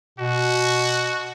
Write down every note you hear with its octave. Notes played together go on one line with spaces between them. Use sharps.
B2 F#4